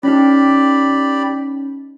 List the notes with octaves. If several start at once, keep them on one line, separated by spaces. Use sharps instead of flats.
C#4 D#4 G4 D5 B5